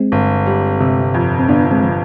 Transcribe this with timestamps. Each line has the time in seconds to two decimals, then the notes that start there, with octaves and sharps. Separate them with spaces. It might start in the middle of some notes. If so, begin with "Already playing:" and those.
Already playing: G#3 C4
0.12 G1
0.46 G3
0.80 C3
1.14 F2
1.39 C4
1.49 G1 B3 D4
1.71 G#3 C4
1.82 F3